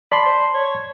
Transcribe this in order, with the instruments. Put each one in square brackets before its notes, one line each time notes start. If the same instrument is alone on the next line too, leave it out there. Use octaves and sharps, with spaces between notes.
[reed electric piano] D5 A5 C6 [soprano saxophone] B5
[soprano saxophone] C5
C#5